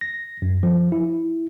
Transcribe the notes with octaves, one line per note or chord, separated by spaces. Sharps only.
A#6
F#2
F3
E4